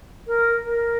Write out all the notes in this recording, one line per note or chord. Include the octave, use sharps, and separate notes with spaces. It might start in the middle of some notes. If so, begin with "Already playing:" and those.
A#4
A#4